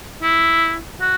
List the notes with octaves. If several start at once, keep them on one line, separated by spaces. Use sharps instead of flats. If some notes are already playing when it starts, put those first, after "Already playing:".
E4
F#4